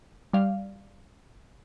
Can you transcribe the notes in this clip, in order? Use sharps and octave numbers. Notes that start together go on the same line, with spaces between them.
G3 D5 F5